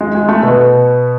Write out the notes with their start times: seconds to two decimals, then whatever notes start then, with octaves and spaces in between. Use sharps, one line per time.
0.01 G#3
0.15 G#3
0.28 A3
0.43 B2 B3